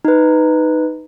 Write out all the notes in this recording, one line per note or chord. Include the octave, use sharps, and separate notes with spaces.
D#4 B4